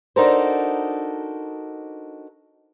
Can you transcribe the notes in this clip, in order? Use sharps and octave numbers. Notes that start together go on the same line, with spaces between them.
D4 D#4 F#4 A4 A#4 C5